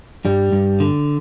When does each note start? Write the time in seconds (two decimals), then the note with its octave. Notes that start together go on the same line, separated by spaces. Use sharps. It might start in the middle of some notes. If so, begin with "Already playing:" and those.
0.25 G2 G3
0.52 G2
0.80 D3